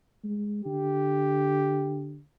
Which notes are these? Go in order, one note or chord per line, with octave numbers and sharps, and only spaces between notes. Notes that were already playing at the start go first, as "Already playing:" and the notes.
G#3
D3 G4